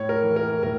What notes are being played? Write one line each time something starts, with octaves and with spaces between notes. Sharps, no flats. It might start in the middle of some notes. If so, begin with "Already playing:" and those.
Already playing: A2 C#5
A#4
E3
A#4
A2 A#4